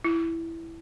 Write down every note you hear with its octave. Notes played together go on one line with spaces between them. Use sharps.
E4